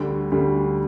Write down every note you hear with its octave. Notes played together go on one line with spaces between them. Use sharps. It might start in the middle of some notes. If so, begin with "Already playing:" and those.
Already playing: D2 D3 G3
D2 D3 G3